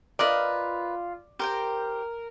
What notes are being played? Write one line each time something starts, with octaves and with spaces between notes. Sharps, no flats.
F4 A#4 B4 D5 D#5
G4 A#4 C5 G5